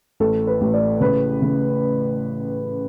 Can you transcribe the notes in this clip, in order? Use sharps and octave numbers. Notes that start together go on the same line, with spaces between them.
A1 A4
B4
A1
D5
C#3 B4
C#3